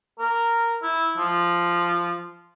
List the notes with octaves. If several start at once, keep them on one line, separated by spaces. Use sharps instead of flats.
A#4
E4
F3